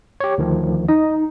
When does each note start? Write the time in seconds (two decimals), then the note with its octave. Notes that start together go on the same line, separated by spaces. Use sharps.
0.20 G4 C#5
0.38 D2 D#3 F3
0.88 D#4 D#5